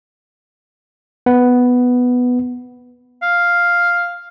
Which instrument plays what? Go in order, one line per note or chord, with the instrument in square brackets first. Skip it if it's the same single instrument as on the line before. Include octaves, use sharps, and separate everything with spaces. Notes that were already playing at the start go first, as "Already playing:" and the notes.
[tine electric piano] B3
[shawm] F5